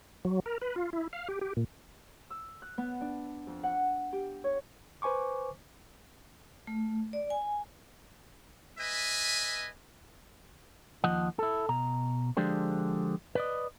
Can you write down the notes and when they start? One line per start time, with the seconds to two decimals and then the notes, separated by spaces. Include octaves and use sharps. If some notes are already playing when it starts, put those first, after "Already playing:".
0.25 F#3
0.46 A#4
0.61 B4
0.76 F4
0.93 E4
1.13 F5
1.28 G4
1.41 G4
1.57 A#2
2.30 E6
2.62 F#6
2.78 B3
3.01 D4
3.47 F2
3.63 F#5
4.13 G4
4.44 C#5
5.02 B4 C5 G#5 C#6 D6
6.67 A3
7.13 D5
7.30 G#5
8.79 B4 D#5 E5 G#5
11.04 D#2 F3 D#5 F#5
11.39 E4 A4
11.69 B2 A#5
12.37 D3 F3 G#3 D4 G4 C5
13.35 B4 D5 D#5